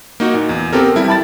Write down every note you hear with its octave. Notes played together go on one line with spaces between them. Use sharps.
A#3 D#4 F#4
A#2
E2
B3 C4 G4 A4 A#4
G3 E4
A5 B5 A6